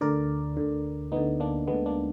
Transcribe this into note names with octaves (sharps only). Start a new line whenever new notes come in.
D2 D3 A#4 D5
D2 D3
D2 D3 B3 D#4
A#3 D4
D2 D3 G#3 B3
A#3 D4